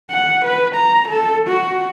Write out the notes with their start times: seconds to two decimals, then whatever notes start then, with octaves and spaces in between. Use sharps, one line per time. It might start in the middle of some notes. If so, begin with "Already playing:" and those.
0.11 F#5
0.45 B4
0.75 A#5
1.09 A4
1.48 F#4